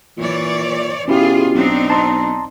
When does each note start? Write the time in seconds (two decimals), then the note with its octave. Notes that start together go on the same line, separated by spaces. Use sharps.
0.17 A#2 E3 C#5 D5
1.08 B2 C#4 E4 F4 G4 G#4
1.54 B1 C4 D4 D#4
1.90 A5 A#5 C6